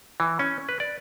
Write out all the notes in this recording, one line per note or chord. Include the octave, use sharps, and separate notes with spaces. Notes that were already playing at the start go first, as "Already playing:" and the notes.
E3
C#4
B4
D5